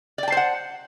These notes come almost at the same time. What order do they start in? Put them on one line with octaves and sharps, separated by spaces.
D5 G5 A5 C5 F#5